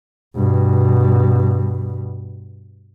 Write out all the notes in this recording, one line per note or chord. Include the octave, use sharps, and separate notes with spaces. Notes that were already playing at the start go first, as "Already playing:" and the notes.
G2 B2